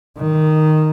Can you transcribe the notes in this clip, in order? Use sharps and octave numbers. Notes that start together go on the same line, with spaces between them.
D#3